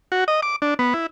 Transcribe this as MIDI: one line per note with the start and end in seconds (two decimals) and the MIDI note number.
0.12 0.24 66
0.28 0.41 75
0.42 0.56 86
0.62 0.74 62
0.79 0.94 59
0.94 1.06 64